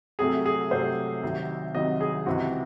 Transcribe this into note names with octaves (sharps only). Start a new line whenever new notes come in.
C2 C3 F#3 A3 G#4
G#4
C2 C3 F#3 A3 C5
C2 C3 D#3 F#3
C2 C3 D#3 F#3 D#5
G#4
C#2 C3 E3 C4 F#4